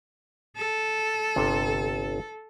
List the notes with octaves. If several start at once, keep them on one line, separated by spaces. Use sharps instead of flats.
A4
G1 C3